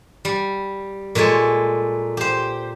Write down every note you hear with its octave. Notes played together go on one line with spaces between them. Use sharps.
G3
A#2 G#3 A4 C#5
G4 C5